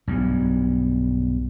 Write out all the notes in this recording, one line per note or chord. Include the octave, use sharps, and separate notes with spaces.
B1 G2